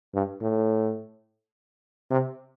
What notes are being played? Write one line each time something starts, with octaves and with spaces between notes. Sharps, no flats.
G2
A2
C3